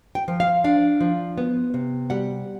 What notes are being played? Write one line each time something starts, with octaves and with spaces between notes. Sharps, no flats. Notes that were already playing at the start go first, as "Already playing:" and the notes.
G5
F3
F5
D4 F5
F3
B3
C3
G3 F#5